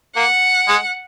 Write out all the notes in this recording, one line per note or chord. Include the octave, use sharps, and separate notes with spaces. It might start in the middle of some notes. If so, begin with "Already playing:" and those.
A#3 F#5
G#3